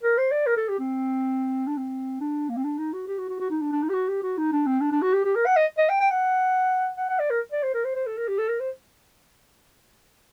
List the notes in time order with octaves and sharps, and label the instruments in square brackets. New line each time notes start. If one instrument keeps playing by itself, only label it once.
[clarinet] A#4
C5
D5
A#4
A4
G4
C4
D4
C4
D4
A#3
C4
D4
D#4
F#4
G4
F#4
F#4
F#4
D#4
D4
D4
D#4
G4
F#4
G4
F#4
D#4
D4
C4
D4
D4
F#4
G4
G4
A#4
F#5
D#5
D#5
G5
G5
F#5
F#5
F#5
D5
A#4
D5
C5
A#4
C5
C5
A4
A#4
G4
A4
A#4
C5